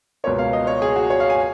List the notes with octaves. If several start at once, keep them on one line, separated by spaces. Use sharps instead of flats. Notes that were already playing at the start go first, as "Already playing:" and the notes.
C#2 B2 A#3 C#5
F5
D#5
C#5
G#4
F#4
C#5
F5
G#5